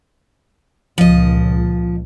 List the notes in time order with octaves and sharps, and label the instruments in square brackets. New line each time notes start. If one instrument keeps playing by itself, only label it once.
[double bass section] C#2 A#2 [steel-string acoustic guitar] F3 D#5